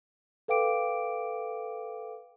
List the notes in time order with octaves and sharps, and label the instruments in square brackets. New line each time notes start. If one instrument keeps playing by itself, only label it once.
[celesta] A4 B4 F5 G5 D6 D7